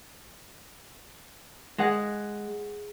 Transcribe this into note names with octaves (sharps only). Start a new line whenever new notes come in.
G#3 G#4 F#5